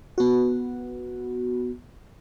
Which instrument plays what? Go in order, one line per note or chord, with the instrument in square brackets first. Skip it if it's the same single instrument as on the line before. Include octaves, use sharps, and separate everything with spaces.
[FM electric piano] B3 F#4